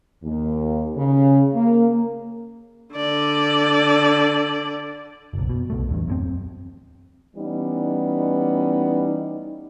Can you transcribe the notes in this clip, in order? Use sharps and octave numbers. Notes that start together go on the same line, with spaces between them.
D#2
C#3
A#3
D3 D5
F#1 B1
B2
B1 B2 A3
D1 E2 G2
F#2 G#3 C4
E3 G3 B3 C#4 D#4